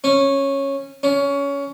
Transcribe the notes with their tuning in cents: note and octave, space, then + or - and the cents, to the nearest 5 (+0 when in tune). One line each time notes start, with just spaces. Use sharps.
C#4 -10
C#4 +20